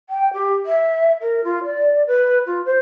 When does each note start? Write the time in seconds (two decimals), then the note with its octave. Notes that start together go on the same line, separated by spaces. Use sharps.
0.10 G5
0.33 G4
0.66 E5
1.21 A#4
1.44 F4
1.65 D5
2.07 B4
2.46 F4
2.66 C5